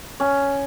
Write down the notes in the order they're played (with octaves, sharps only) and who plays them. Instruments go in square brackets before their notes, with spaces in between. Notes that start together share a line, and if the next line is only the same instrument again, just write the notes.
[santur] C#4